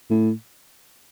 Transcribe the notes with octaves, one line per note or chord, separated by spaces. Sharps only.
A2